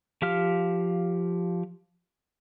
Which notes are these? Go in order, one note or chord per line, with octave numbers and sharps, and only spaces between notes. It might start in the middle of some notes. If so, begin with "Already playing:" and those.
F3 G4 F5 F6